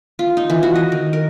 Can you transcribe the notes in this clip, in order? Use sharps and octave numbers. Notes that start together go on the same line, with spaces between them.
F4
D#4
E3
F#4
D#5
D#3
A#4